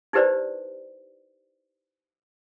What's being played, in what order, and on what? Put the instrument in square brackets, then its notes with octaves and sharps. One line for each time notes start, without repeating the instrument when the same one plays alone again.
[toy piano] D#4 E4 G4 B4 C5 D5